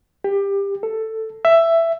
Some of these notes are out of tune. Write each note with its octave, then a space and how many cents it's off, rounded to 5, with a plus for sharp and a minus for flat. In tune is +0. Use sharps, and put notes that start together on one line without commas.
G4 +20
A4 +10
E5 +10